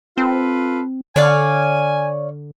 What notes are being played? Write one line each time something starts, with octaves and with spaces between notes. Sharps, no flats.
C4 F4 A4 B4
D3 C#5 D5 F5 G#5